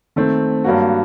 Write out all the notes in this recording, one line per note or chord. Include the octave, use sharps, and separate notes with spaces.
D#3 A3 C4
G2 F#3 A#3 F#4